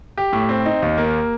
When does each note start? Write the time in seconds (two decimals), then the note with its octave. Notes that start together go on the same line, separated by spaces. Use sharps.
0.18 G4
0.33 A2
0.49 C4
0.66 D#4
0.82 D#2
0.98 A#3